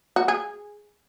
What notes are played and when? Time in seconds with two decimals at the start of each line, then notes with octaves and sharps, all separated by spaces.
0.16 F#4
0.28 G#4